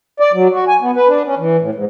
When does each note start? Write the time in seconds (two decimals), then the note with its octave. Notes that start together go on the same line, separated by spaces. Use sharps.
0.20 D5
0.33 F#3
0.52 F#4
0.68 G#5
0.82 B3
0.96 B4
1.08 D4
1.26 C#4
1.38 E3
1.60 A2
1.75 G#2